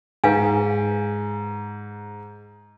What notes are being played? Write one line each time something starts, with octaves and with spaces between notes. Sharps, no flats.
G#2 B4 F5 G#5